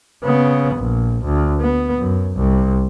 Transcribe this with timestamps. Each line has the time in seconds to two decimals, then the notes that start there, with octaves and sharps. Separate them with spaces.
0.24 C#3 B3
0.76 A#1
1.24 D2
1.61 B3
1.99 F#2
2.36 C2